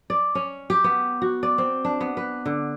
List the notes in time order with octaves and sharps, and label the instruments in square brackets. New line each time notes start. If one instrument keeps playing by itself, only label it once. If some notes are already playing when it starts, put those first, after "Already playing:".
[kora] D5
C#4
G4
B3
F#4
D5
C4
D4
B3
B4
D3